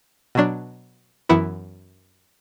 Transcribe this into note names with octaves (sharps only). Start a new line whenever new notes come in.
B2 F#3 D4
F#2 E3 B3 E4 F#5